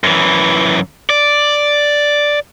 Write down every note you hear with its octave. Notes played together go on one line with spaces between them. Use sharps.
F#2 E3
D5